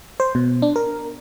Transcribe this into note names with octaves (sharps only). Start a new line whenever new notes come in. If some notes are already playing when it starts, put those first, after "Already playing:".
C5
B2
D4
A#4